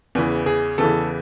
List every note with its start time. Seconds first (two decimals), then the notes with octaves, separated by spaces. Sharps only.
0.15 E2 C#3 E3
0.46 G#4
0.78 E2 C#3 E3 A4